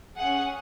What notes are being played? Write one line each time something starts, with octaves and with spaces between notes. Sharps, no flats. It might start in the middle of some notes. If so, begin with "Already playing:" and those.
C#4 G#4 F#5